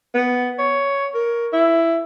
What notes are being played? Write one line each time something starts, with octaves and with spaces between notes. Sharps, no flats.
B3
C#5
A#4
E4